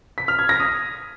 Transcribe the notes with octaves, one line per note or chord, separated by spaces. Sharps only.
B6
F6
G#6
A#6
D#6